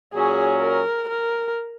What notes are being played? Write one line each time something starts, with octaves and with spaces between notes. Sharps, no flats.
A#2 F#3 C#4 G#4
A#4
A#4